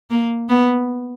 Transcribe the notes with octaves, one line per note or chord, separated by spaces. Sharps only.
A#3
B3